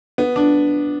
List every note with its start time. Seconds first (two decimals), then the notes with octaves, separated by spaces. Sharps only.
0.18 B3
0.36 D4